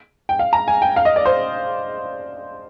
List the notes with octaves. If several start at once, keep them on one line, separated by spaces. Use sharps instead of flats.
G5
F5
A#5
G#5
G5
F5
D#5
D5
C5